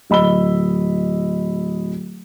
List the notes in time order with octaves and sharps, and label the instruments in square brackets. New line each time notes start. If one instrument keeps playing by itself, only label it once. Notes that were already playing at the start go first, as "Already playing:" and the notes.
[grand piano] D1 D#5 B5 E6 G7